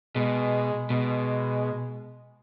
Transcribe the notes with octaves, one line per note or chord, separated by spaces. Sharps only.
B2 G#3
B2 G#3